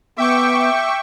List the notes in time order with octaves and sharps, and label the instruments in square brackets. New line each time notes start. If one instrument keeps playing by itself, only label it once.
[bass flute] B3 [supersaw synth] E5 G5 C#6 [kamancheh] D6